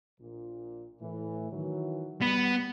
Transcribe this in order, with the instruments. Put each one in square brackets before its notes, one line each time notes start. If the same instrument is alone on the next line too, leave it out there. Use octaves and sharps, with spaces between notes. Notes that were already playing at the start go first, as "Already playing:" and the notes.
[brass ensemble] A#1 A#2
A2 E3
D#3 E3 F#3
[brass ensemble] G3 [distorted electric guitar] B3